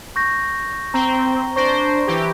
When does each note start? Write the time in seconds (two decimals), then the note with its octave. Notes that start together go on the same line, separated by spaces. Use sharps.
0.16 C#6 G6 A#6
0.94 C4 A#5 G7
1.56 D4 C5 C#6 A#6 D7
2.07 E3 G4